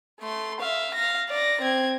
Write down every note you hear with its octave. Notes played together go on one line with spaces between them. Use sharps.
A3 C6
E5 F5
F5 A#6
D5 A#6
C4 G#6